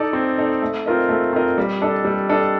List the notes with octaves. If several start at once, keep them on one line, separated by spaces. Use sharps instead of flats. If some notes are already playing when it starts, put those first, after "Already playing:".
Already playing: D#4 A4 D5
C4
D#4 A4 D5
A3
C4 F4 A#4 D#5
A3
C4 F4 A#4 D#5
G3
D4 A4 D#5
G3
D4 A4 D#5